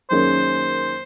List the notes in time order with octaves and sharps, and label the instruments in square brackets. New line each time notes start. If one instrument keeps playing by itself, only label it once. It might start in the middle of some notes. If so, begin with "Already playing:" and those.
[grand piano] F#2 D#3 A#3 C#4 G#4 [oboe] C5